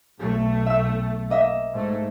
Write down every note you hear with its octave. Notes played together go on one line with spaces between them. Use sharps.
B1 A3
E5 E6
A#3 D#5 E5
G#2 A3